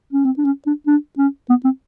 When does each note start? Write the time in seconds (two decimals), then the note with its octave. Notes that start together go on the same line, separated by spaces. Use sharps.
0.13 C#4
0.25 C4
0.38 D4
0.45 C#4
0.67 D4
0.87 D4
1.18 C#4
1.50 B3
1.65 C4